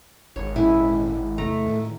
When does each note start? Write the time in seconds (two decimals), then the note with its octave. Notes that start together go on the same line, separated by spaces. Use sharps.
0.36 G#1 C#5
0.56 A#2 G#3 C#4 E4 G#5
1.38 E2 C3 D#3 A3 A#5
1.65 A2 D#3